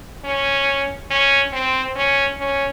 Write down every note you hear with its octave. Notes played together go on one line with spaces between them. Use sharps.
C#4
C#4
C4
C#4
C#4